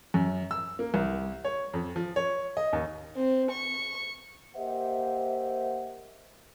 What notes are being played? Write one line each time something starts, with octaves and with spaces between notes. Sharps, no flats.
F#2
E6
A#3
C2
C#5
F2
F3
C#5
D#5
D#2
C4
C#6
A#3 G4 C5 D#5 E5 F#5